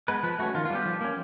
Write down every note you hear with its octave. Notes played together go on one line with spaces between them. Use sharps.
G#3 B3 B4
F3 B4
A3 C#4 F#4
D#3 F4
F4
G3 B3 G4
F3
A#3 C#4